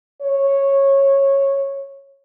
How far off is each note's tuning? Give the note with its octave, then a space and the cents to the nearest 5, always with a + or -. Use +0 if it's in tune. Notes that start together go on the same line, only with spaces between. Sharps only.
C#5 -10